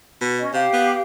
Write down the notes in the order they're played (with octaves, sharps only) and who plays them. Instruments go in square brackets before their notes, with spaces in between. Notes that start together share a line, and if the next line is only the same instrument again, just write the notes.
[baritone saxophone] B2
[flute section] C#4 D#5
[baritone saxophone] C3 [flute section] G4 F5
[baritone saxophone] B3